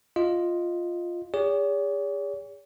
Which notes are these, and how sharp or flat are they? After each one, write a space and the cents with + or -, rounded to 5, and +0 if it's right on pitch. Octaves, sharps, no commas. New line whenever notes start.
F4 +0 D#5 +0
G#4 -40 C#5 +45